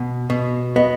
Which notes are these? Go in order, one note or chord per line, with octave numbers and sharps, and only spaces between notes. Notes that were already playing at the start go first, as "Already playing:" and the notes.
Already playing: B2
B2
B3 D#5